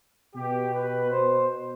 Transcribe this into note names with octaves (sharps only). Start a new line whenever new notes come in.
B2 G4
B4
C5